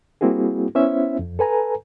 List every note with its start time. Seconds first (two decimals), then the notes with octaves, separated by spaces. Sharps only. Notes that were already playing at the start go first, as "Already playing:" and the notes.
0.21 G3 A#3 C4 E4 F#4 G#4
0.75 B3 C#4 E4 C5 E5
1.19 F2
1.39 A4 B4 G#5 A#5